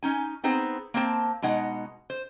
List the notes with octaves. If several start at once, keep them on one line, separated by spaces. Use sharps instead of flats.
C#4 D#4 G#5
B3 C4 D#4 G#4 C5
A#3 C4 C5 A5
B2 G#3 D#4 F#5
C5